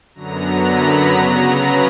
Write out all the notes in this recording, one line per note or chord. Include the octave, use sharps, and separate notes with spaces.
F#2 D3 F#3 B3 A#5
B5
C#3 F#3 B3 A#5
B5